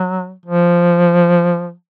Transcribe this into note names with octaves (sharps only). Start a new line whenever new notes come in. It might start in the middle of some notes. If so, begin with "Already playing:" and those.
Already playing: F#3
F3